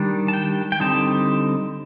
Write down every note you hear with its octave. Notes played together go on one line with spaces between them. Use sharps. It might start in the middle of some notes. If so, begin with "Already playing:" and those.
Already playing: D#3 G3 D4
A5
G5
G5
D3 G3 C4 D#4 A5